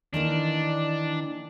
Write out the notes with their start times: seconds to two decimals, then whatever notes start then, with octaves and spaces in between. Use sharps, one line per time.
0.14 D#3 E3 A#3 D4